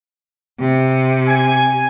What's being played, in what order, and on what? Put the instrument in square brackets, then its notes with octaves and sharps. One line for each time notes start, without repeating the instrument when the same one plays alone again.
[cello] C3
[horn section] G#5